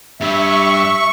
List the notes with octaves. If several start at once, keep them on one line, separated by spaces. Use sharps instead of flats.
G2 G3 E5 C#6